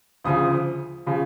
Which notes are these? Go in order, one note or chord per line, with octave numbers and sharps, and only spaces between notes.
D2 C#3 F3 D#6
C#3 F3